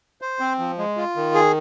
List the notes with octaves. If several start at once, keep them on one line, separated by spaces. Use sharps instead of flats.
C5
C4
F3
G#3
F4
D#3
G#4